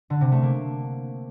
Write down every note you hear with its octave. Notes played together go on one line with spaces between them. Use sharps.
D3
C3
A3
A#3